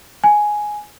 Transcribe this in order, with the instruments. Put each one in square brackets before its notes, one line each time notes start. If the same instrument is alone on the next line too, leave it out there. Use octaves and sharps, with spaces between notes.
[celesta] G#5